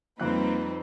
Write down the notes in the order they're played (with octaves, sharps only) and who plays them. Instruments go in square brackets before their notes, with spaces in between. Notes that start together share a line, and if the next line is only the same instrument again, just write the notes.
[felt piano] F2 F#6 [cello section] G3 C4 [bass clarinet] A#3 [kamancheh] D#4 B4